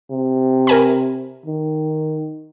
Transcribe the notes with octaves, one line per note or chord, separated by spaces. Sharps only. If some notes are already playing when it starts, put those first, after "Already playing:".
C3
A#4 G#5 B5
D#3